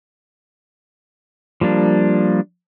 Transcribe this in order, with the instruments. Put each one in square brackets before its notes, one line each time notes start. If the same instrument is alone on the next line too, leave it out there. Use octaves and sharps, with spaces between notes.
[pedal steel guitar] F3 G3 A#3 D4